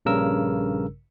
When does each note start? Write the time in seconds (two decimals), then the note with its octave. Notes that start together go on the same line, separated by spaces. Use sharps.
0.05 A#1 G2 C#3 A#4 E6